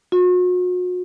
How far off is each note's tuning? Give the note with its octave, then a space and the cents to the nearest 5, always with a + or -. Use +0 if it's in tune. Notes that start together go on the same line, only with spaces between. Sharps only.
F#4 -40